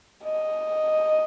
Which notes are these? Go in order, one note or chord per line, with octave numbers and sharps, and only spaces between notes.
D#5